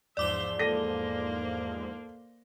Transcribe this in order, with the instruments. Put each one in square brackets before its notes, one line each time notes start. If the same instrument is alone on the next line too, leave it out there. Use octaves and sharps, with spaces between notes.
[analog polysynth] E2 G#2 F3 [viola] C5 E5 [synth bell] D5 D6 G7
[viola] A#3 C5 [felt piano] A4 A#6 D#7